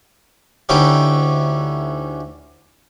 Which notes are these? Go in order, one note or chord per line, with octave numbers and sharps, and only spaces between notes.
D2 C#4 D#4 E4 G4